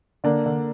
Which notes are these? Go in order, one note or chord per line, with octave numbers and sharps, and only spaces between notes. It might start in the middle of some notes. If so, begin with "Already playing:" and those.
D3 A#3 D4
D3